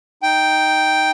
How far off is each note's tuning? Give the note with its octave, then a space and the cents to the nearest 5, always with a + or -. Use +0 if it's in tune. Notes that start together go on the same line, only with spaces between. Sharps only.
D#4 +0 G5 +0